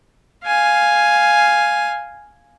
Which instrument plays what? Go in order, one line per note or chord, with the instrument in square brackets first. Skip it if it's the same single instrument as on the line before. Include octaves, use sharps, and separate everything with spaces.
[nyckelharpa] F5 G#5